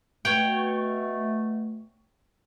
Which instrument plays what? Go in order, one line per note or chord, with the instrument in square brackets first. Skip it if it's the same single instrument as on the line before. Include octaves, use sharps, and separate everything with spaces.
[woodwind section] B2 A3 [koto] C#5 F#5 G5